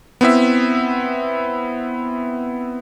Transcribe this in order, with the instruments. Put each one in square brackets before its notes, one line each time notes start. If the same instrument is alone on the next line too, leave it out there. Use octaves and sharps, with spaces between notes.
[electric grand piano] B3 C4 E4 E5